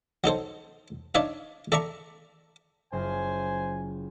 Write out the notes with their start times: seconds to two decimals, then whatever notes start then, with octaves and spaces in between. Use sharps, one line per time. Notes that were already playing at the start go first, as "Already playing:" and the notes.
0.24 F#3 D#4 A4 C5
1.15 D4 D#4 C#5 D5 E5 F5
1.72 A4 D5 E5 A#5 C#6
2.93 F#1 F4 C5 G#5